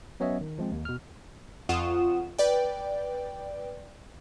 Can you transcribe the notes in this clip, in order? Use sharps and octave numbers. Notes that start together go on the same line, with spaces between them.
F#3 B3 C#4 C#5 D#5 E5
D#3
F3 G#3 C4
D#2
B2 F6
F2 F4 F#5 C#6 D#6 E7
B4 D5 G5